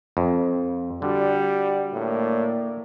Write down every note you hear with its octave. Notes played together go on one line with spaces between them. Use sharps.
F2
D3 G3 F#4 D5 F#5
A2 A#3 D5